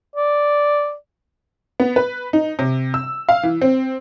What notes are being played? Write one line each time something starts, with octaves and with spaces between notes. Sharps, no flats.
D5
B3
B4
D#4
C3
E6
F5
E3
C4